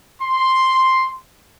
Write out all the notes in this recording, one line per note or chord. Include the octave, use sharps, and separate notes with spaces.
C6